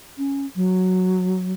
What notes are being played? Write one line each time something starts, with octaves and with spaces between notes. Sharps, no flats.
C#4
F#3